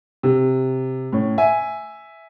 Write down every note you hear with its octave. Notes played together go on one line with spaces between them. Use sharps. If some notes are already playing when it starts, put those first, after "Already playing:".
C3
A2 C#4
E5 G#5